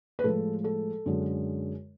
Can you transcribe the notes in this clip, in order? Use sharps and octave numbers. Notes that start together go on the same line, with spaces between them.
B4
A2 F3 G#3 A4
A4
F#2 D3 G#3